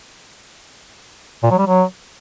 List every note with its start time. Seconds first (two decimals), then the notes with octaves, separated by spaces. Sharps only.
1.43 A#2
1.51 F#3
1.59 G3
1.66 F#3